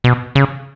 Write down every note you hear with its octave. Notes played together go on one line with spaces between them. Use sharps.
B2
C#3